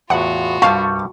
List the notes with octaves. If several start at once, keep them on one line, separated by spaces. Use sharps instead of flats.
E2 A2 F4 F#4 F#5
C2 G2 G3 F5 A5 C#6